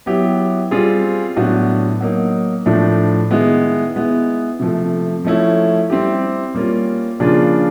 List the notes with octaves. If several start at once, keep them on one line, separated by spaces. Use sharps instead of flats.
F#3 B3 E4 G4
G3 C4 F4 G#4
A2 F#3 B3 D4 F#4
F#3 A#3 D#4
A2 F3 A3 D4
D#3 G#3 B3 E4
G#3 B3 E4
C3 F3 A3
F3 A3 C#4 E4
G3 C4 E4 G4
G3 A#3 C#4 F4
C#3 F3 A#3 D4 F4